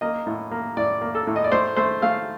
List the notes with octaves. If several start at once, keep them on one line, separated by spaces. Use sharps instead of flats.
A#3 D#5
A2
A#3
A2 D5
A#3
A4
A2
D#5
D5
A3 C5
A3 C5
A3 F5